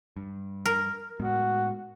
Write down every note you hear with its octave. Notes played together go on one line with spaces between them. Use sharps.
G2
A#4
A2 G#3 B3 F#4